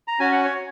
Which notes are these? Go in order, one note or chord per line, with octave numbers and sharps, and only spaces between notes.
A#5
C#4 F#4 G#5
F#5
C#5